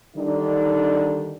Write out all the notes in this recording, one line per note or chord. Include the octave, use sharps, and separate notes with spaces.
D3 D#3 G3 D4 D#4